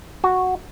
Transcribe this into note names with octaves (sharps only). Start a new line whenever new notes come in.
F#4